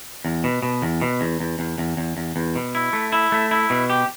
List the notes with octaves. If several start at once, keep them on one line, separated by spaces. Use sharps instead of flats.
E2
B2
B2
E2
B2
E2
E2
E2
E2
E2
E2
E2
B2
E4
A3
E4
A3
E4
B2
G4